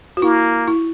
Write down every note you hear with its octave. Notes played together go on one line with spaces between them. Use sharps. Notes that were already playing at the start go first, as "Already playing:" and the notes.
F#4
A#3 E4
E4